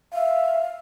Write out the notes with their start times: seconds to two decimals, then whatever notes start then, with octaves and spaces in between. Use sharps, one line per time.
0.13 E5 F5